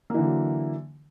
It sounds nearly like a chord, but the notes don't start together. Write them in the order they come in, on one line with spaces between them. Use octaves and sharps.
A#3 E3 D3 F#3